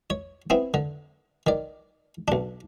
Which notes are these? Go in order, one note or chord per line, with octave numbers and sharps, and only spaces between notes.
C#5
B3 C4 E4
D3
D#3 D5
B1 D4